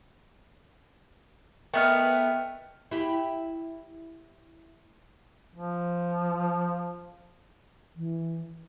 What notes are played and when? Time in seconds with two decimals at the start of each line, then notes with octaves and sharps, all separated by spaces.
1.74 A3 B3 A#4 B4 D#5 G5 F6
2.91 E4 G4
5.55 F3
7.96 E3